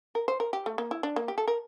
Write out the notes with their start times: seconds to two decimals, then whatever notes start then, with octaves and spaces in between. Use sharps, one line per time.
0.15 A#4
0.28 C5
0.40 A#4
0.53 G4
0.66 A3
0.78 A#3
0.91 E4
1.03 D4
1.16 A#3
1.28 G4
1.38 A4
1.48 A#4